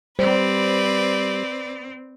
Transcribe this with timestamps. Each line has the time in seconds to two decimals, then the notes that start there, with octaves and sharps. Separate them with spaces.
0.19 G3 C4 B4 C5 D5